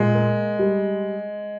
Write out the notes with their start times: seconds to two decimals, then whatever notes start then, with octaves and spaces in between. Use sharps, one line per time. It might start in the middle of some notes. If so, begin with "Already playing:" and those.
Already playing: A#2 G#3
0.15 A#3
0.59 G3